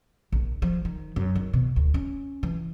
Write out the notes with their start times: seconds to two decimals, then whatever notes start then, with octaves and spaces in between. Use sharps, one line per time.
0.32 A#1
0.62 F3
0.85 D#3
1.16 F#2
1.35 D#3
1.53 B2
1.76 D2
1.94 C#4
2.43 E3